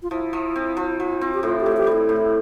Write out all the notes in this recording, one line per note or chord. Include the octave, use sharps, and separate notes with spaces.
F4
F3 E4
F3
C4
F3
F3
C4
G4
A2 F4
G4
A2
G4
G3
E4
A2